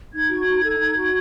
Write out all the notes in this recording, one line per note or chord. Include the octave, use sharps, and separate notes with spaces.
D#4 G#6
F#4
D#4
A4
D#4
F#4